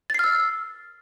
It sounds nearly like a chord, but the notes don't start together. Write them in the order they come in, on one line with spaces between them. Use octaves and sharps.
A6 C7 F6 E6